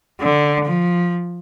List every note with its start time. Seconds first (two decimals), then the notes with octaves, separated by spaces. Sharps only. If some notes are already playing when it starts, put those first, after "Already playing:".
0.21 D3
0.67 F3